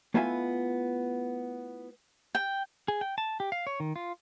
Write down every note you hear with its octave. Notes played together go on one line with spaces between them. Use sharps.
A3 B3 E4 F4 E5 G#5
G5
G#4
G5
A5
G4
F5
C#5
D#3
F4